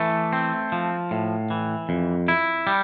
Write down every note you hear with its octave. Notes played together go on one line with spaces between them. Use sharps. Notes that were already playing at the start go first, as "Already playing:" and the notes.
Already playing: E3 A3
C4
F3
A2
E3
F2
E4
G3